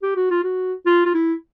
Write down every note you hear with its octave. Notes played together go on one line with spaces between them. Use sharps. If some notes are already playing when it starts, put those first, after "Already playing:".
G4
F#4
F4
F#4
F4
F4
E4